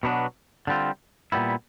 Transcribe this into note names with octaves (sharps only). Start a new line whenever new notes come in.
B2 F#3 B3 D4
D3 G3 C4 F4
A#2 G3 B3 E4